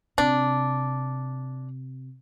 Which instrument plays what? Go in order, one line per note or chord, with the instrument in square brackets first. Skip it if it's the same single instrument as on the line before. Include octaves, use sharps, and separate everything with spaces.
[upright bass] C3 [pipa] D4